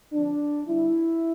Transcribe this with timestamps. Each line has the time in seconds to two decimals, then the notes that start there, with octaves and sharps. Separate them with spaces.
0.12 D3 F3 C4 D4
0.68 D3 G3 D4 E4